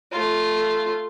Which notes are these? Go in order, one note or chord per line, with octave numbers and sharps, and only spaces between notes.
A3 F4